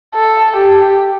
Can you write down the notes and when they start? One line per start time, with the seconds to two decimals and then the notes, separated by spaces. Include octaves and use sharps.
0.15 A4
0.56 G4